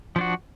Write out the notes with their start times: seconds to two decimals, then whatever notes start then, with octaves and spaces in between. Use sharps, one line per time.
0.16 F3
0.18 D4
0.21 F#4